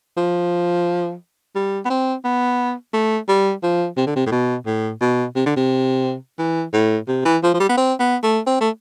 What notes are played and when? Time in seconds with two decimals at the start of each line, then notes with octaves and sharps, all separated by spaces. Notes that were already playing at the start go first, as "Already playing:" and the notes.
0.17 F3
1.55 G3
1.85 B3
1.90 C4
2.25 B3
2.94 A3
3.28 G3
3.63 F3
3.97 C3
4.07 D3
4.16 C3
4.26 A2
4.31 B2
4.66 A2
5.01 B2
5.35 C3
5.46 D3
5.57 C3
6.39 E3
6.73 A2
7.08 C3
7.25 E3
7.43 F3
7.54 F3
7.60 G3
7.69 B3
7.77 C4
8.00 B3
8.23 A3
8.47 C4
8.61 A3